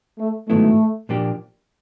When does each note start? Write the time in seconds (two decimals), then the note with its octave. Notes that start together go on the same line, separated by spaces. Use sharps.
0.19 A3
0.48 G#2 D#3 F#3 A3 B3 E4
1.09 A#2 F3 A#3 D4 G4